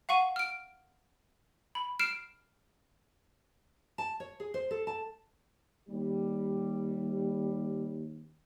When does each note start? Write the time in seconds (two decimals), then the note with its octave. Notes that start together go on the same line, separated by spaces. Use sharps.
0.09 F5 F#5 C#6 D#7
0.36 F6 D7
1.75 B5
1.99 F6 C7 D7 E7
3.98 A5
4.20 C#5
4.40 G#4
4.54 C5
4.71 A4
4.87 A5
5.88 D#2 G3